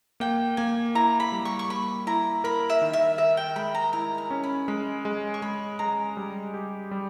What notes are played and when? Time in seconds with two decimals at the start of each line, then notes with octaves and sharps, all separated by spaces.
0.20 A#3 G5
0.57 A#3 G#5
0.95 E4 A#5
1.20 B5
1.32 G3
1.45 C#6
1.59 C#6
1.69 A#3 B5
2.07 E4 A#5
2.44 A#4 B5
2.70 E5
2.81 D#3
2.93 E5
3.18 A#4 E5
3.37 G5
3.56 G#3 B5
3.75 A#5
3.93 E4 A#5
4.18 A#5
4.31 C#4
4.44 B5
4.68 G#3 B5
5.05 G#3
5.34 C#6
5.42 G#3 B5
5.79 G#3 A#5
6.17 G3
6.54 G4
6.91 G3